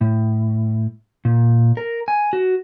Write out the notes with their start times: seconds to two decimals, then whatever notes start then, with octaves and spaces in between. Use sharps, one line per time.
0.01 A2
1.25 A#2
1.77 A#4
2.08 G#5
2.33 F#4